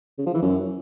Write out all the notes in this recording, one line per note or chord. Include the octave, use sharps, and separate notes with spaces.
C#3
F3
E3
F#2